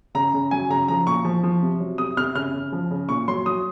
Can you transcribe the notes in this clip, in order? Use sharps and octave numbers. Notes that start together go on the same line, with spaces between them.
C#3 A#5
C#3
F#3 G#5
C#3 A#5
F3 A#5
A#2 C#6
F3
F3
C3
F#3
C3 D#6
C3 F6
C#3 F6
C#3
F3
C#3
A#2 C#6
F#3 C6
F#3 D#6